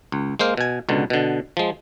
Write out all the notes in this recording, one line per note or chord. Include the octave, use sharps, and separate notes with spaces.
C#2
G#3 A#3 C5 F5
B2 G#5
C#2 B2 D3
B2 D3
F3 G#3